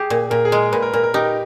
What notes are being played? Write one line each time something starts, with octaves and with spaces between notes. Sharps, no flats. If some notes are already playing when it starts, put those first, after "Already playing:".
Already playing: G4 G#4
A#2
A#2 A#4
G#4
G#3 A#4
A#2 B4
A#4
A#2 A#4
A#4
D#4 G4